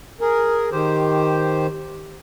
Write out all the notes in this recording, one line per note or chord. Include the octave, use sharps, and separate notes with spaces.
G#4 A#4
D#3 G4 C5